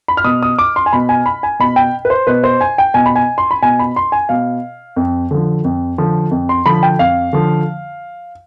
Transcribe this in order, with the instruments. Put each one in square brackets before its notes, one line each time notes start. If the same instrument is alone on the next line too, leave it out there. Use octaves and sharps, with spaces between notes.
[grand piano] B5
F6
B2 D#6
D#6
D6
C6
G#5
B2 B5
G#5
B5
G#5
B2 B5
G5
B4
C5
B2 B4
C5
G#5
G5
B2 G#5
B5
G#5
C6
B5
B2 G#5
B5
C6
G#5
B2 F5
F2
D3 F3
F2
D3 F3
F2
C6
D3 F3 B5
G5
F2 F5
D3 F3